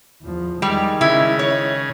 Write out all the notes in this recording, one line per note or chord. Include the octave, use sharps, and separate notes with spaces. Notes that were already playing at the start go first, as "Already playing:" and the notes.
E2 F3
D#3 G3 G#3
C#3 E4
C#5